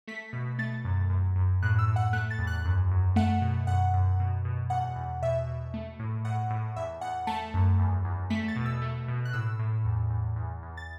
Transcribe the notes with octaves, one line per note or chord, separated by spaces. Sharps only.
A3 B6
B2
A3 A6
F#2
F#2
F#2
A2 F#6
E6
A2
F#5
A3 F#6
A6
E2
F#6
F#2
F#2
A3 F#5
B2
F#2 F#5
F#2
B2
B2
E2 F#5
E2
B2 E5
B2
A3
A2
A2 F#5
A2
E2 E5
E2 F#5
A3 A5
F#2
E2
E2
A3 B6
A6
B2
E6
A3
B2
F#6
A2 E6
A2
E2
E2
E2
E2
A6